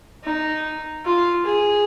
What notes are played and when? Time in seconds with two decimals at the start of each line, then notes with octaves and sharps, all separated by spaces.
0.24 D#4
1.05 F4
1.45 G#4